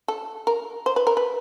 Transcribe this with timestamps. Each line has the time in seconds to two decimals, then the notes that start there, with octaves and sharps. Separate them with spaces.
0.08 A4
0.47 A#4
0.86 C5
0.96 B4
1.07 A#4
1.17 B4